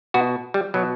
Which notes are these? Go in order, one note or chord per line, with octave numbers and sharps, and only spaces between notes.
B2 F#4
G3
B2 F#3